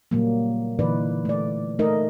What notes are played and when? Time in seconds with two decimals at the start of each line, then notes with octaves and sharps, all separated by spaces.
0.11 A#2 C#3 F#3 G3 A#3
0.79 A#2 D3 E3 D#4 B4 D5
1.25 A3 D5
1.79 A3 D#4 A#4 D#5